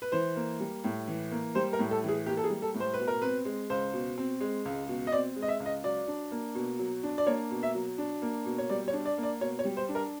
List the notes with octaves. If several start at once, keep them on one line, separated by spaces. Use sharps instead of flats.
B4
E3 C5
A#3
G3
A2
E3
A#3
G3 C5
A#4
A2
A4
E3
G#4
A#3 G4
A4
G#4
G3
A4
A2
C5
B2 B4
A#4
C4 B4
G#3
C#2 C5
B2
C4
G#3
C#2
B2
D#5
C4 D5
G#3
D#5
E5
C#2
D#5
F#3 D5
D4
A#3
B2
F#3
D4
D5
A#3 C#5
B2
E5
F#3
D4
A#3
B2
C#5
G3 D5
C#5
D4
D5
A#3
D5
B2 C#5
C#5
G3
C5
D4
A#4